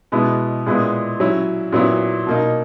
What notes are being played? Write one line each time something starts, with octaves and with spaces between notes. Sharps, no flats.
B2 G#3 B3 E4
A#2 G#3 B3 E4
F#3 C#4 E4
A#2 F#3 B3 E4
B2 A#3 D#4